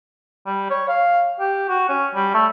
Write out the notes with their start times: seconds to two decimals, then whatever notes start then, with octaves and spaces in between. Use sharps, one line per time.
0.46 G3
0.70 C#5
0.88 F5
1.40 G4
1.69 F#4
1.89 C#4
2.15 G3
2.34 A3